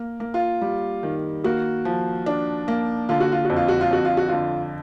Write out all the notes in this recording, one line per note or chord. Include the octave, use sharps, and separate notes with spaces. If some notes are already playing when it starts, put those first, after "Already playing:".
Already playing: A#3
A#3
F4
G3
D#3
A#3 F#4
F3
D4
A#3
D3 F4
F#4
F4
F#4
F2
F4
F#4
F4
F2 F#4
F4
F#4
D3 F4